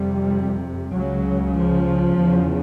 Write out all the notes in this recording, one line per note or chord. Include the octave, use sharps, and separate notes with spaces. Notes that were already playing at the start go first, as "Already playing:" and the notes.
Already playing: F2 C3 G3
C#2 C#3 F#3
F3
E2 C#3